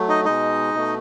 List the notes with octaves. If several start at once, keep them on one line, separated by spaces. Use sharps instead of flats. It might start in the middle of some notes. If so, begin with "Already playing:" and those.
Already playing: F#3 A3
D#4 D#5
B2 G#3 D#4 D#5
B2 A3